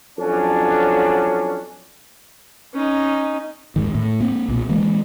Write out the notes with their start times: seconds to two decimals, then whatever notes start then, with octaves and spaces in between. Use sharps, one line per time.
0.19 F2 F#3 C#4 D4
2.73 C#4 D#4
3.76 D#1 G#2 D#3
3.95 A2
4.20 A#3 C4
4.48 B1 A#2
4.69 E3 G#3 A#3